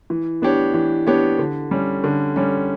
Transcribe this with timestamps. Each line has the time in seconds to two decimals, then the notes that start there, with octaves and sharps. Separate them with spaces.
0.10 E3
0.42 B3 D4 G4 C#5
0.74 E3
1.07 B3 D4 G4 C#5
1.39 D3
1.71 G3 C#4
2.04 D3
2.36 G3 C#4